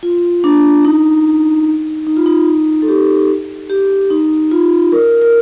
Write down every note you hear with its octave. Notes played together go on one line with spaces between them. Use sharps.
F4
D4
D#4
D#4
F4
D#4
A4
G4
G4
D#4
F4
A#4
A#4